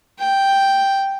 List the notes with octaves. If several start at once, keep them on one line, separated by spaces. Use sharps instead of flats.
G5